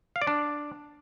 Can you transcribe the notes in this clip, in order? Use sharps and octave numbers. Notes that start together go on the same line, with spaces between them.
F5
D5
D4